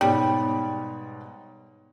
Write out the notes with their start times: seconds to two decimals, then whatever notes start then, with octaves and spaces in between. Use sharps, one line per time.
0.01 G#2 B2 G3 C#5